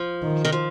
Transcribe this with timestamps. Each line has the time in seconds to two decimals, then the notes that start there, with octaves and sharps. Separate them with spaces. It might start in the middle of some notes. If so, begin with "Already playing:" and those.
Already playing: F3
0.22 D#3
0.45 D#3
0.52 F3